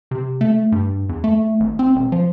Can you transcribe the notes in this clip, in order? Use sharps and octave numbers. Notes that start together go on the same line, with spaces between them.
C3
A3
G2
E2
A3
G#1
C4
E1
F3